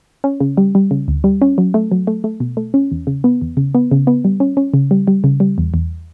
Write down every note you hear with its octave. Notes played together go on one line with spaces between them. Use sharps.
C#4
C#3
G3
G3
C#3
D2
G3
C#4
F#3
A3
F#3
A3
A3
B2
A3
C#4
E2
C#3
B3
E2
C#3
B3
C#3
B3
G3
C#4
C#4
C#3
G3
G3
C#3
G3
E2
E2